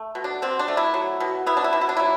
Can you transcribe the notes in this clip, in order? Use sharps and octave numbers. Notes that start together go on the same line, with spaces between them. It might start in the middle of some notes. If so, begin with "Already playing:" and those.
Already playing: A3
B2
D4
B2 C4
D4
A3
E4
F#3
B2
B3 E4
D4
E4
B2
E4
D4
F#3 E4